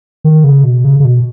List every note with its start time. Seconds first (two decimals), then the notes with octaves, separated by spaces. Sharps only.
0.24 D#3
0.44 C#3
0.64 B2
0.85 C#3
1.00 C#3
1.05 B2